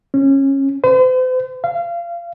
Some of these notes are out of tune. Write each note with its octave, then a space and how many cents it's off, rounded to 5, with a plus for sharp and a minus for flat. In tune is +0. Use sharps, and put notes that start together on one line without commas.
C#4 -20
C5 -40
F5 -25